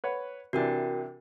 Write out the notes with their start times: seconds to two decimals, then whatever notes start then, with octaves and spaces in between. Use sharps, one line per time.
0.04 B4 C#5 F#5
0.53 C3 E3 D4 F#4 A#4 G5